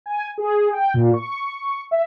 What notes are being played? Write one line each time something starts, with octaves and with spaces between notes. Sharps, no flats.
G#5
G#4
G5
A#2
C#6
E5